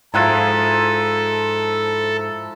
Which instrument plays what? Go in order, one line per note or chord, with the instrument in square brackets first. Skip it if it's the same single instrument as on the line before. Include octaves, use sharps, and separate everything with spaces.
[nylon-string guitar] G#2 G5 [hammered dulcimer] F3 E4 [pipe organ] A4 [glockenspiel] A#5 F#6 A6